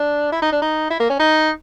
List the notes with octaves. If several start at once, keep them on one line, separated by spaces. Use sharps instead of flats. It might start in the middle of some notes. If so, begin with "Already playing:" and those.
Already playing: D4
E4
D#4
D4
D#4
E4
A#3
C#4
D#4